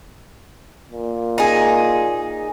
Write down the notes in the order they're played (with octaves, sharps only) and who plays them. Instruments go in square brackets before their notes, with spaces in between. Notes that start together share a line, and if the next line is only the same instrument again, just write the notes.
[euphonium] A#2
[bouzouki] D#4 G#4